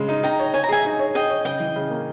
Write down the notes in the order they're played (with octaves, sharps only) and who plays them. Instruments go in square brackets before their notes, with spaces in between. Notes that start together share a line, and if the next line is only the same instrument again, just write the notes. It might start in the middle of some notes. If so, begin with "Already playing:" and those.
Already playing: [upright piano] C#3 G#3
D#4
[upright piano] D#4 [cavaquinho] G5 A#5
[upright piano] C#5
[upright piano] C#5 [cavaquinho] G#5
[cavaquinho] A#5
[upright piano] G#4 [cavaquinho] E5 G#5
[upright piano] D#4
C#5
[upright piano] G#4 [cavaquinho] D#5 G5
[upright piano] C#5
[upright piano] C#3 [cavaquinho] D#5 G5
[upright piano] E3
C#3
A#3